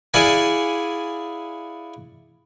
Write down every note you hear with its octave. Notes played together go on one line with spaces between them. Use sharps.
E4 G#4 D5 F5 F#5 G#5